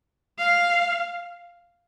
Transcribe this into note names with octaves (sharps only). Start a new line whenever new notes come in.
F5